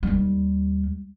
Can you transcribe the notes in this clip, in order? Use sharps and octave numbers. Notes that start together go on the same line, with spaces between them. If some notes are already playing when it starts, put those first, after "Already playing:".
D#2 G3